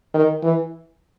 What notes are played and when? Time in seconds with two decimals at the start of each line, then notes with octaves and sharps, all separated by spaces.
0.14 D#3
0.43 E3